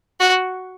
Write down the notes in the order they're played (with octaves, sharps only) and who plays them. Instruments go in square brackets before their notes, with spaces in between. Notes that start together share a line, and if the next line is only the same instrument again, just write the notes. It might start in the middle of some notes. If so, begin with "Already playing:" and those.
[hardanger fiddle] F#4